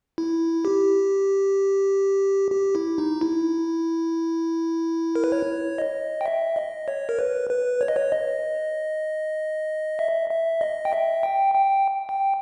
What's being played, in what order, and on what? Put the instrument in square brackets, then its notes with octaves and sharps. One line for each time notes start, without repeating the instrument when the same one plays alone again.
[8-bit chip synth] E4
G4
G4
E4
D#4
E4
A#4
B4
C#5
D#5
G5
E5
D#5
C#5
A#4
B4
B4
C#5
D#5
C#5
D#5
E5
E5
D#5
G5
E5
G5
G5
G5